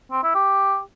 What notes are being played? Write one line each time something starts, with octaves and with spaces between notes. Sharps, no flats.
C4
E4
G4